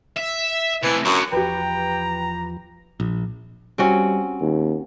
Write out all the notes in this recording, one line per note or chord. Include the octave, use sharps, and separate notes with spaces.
E5
C3 E3 A3
F#2 D3 F#4
E2 F3 G4 B4 G5 A#5
A#1
G3 C4 C#4 F#4
D#2